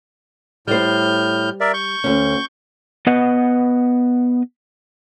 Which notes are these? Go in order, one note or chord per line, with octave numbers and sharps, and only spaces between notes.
A2 G3 C5 F6 G6
A#4 D5 E5
C#6 G6
D2 C#4
B3 B4 D#5 F#5